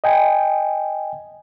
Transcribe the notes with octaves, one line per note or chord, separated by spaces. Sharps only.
D#5 G5 G#5